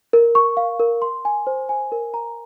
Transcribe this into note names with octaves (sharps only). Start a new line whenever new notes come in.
A#4
C#6
F5
A#4
C6
G#5
C5
G#5
A#4
A#5